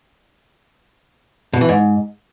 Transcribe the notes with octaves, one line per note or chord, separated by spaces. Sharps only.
B2
E3
G#2